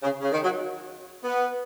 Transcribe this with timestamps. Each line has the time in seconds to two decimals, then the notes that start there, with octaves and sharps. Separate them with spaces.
0.03 C#3
0.21 C#3
0.32 D#3
0.43 F#3
1.24 B3